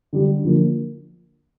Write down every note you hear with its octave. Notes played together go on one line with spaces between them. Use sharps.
D3 G3 D4
D3 F3 A#3